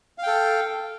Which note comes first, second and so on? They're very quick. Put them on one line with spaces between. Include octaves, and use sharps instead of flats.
F5 G5 A4